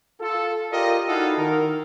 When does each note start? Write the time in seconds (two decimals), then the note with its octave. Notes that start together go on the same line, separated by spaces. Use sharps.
0.21 F4 A4
0.72 F4 G4 A#4 D5 D#5
1.08 D#4 E4 F#4 A4 F5
1.37 D#3 A#4